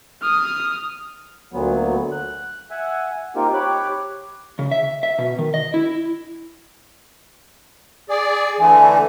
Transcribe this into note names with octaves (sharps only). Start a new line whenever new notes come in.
D#6 F6
D2 A#2 F#3 B3
F#6
E5 F#5 G#5
A#3 C4 D#4 F4 G4 A#4
G4 C#5 B5 D6 F#6
C#3
E5
E5
B2
D#3
D#5
E4
G#4 D5
D3 E3 A3 G#5